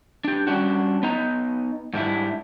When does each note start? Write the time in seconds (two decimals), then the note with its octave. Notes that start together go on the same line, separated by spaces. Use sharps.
0.24 D4 G4
0.47 G3 C#4 D4 F#4
1.03 B3 D#4 A#5
1.93 G#2 G3 D4 E4